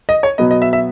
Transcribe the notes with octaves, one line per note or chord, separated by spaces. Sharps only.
D#5
C#5
B2 F#3 B3 D#5
D#5
E5
E5